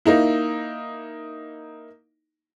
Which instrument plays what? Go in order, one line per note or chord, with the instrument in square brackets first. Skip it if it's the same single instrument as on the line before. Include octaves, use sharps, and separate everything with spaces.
[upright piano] A#3 D#4 E4